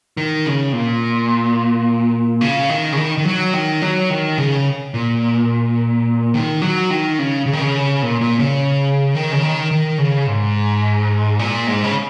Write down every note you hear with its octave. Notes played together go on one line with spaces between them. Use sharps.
D#3
C#3
A#2
C#3
D#3
C#3
D#3
D#3
F#3
D#3
F#3
D#3
C#3
A#2
D#3
F#3
D#3
C#3
C#3
D#3
C#3
A#2
A#2
C#3
D#3
C#3
D#3
D#3
C#3
G#2
A#2
G#2
C#3